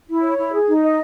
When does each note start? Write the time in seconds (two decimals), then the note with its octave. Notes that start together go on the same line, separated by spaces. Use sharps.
0.09 E4
0.23 C#5
0.38 E4
0.52 G#4
0.68 D#4
0.82 D#5